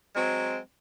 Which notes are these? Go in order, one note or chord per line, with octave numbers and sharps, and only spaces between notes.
F#3 G#3 C4